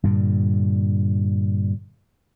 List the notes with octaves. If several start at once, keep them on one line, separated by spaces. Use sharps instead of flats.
G2 A#2 D3